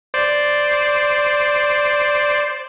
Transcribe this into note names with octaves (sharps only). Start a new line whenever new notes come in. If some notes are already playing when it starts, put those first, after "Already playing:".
C5 D5